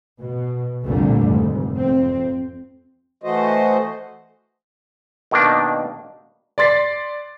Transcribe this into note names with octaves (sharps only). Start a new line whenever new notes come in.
B2
C2 F2 A#2 D3 G3 A3
F1 D#2 G#2
F2 C4
E3 A3 F#4 C5 D#5
B2 D#3 A#3 D4
D5 C6 A6 B6 C7